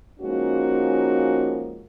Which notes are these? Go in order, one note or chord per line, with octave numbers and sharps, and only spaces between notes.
F3 G#3 A#3 C#4 D#4 F#4